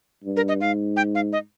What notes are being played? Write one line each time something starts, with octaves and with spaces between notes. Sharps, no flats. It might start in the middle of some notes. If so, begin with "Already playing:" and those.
G2
A#4
D#5
G#2 F5
G5
F5
D#5